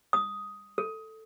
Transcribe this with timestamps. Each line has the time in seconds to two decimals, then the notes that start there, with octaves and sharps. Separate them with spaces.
0.13 D#6
0.78 A4